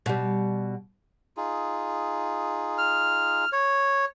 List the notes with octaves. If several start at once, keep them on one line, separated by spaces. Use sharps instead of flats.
B2 G3
D#4 F4 G#4
F6
C#5